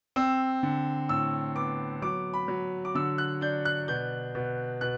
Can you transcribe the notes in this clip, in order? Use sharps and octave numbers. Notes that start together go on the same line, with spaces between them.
C4 E6
D3
A2 E6
B3 D6
F#3 D6
B5
F#3
D6
D3 E6
F#6
D4 G6
F#6
B2 G6
B2
B2 F#6